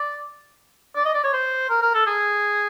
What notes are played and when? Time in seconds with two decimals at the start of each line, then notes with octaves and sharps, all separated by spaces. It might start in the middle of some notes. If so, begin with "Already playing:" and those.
Already playing: D5
0.96 D5
1.06 D#5
1.14 D5
1.24 C#5
1.33 C5
1.70 A#4
1.82 A#4
1.94 A4
2.07 G#4